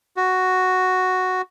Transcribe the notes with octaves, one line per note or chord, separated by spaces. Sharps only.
F#4